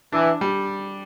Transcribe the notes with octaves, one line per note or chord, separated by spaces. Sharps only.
E3 D4
G3